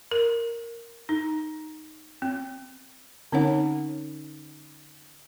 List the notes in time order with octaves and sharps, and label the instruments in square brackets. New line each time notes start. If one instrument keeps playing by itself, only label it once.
[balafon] A#4
D#4
C4
D3 C4 C#4 D#4 C#5 F#5